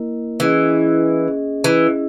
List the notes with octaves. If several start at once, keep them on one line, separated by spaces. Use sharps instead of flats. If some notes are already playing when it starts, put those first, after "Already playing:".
Already playing: A#3 E4 A#4 D#5
E3 C#4 G#4 D#5
E3 C#4 E4 G#4 D#5